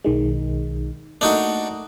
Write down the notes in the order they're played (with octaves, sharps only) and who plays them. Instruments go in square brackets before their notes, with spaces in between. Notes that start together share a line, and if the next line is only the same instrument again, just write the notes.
[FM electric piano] B1 D#3 G#3
[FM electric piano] A3 A#3 [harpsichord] D4 D#4 F#4